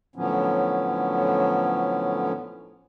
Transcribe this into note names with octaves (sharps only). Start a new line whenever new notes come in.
A2 D3 F3 F#3 B3 C#4